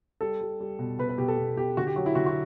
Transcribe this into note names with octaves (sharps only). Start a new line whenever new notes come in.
G3 A4
G3
G3
B2
B2 B4
B4
B2 G4
A4
B2
B2 G4
D3 F#4
G4
F#3 F#4
E4
D3 F#4
F#4